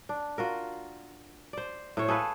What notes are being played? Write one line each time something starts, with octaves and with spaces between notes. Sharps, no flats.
D4
F4 F#4 A#4
C5 D5
A2 C5 C#5
G#4 A4 B4 F5